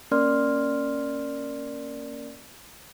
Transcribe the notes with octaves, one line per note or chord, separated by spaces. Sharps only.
A#3 C#4 A#4 D5 C6 F6